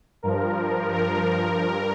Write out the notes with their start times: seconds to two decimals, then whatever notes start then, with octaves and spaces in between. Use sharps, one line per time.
0.23 G2 F3 A#4
0.93 A#4
1.62 G2